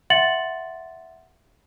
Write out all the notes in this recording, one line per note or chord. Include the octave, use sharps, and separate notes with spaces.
E5 F#5 C6 A6 C#7 F#7